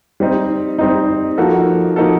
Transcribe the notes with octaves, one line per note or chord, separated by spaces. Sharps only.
G3 C4 D#4
G3 C4 D#4
F3 A#3 D#4 F#4 A4
F3 A#3 D#4 F#4 A4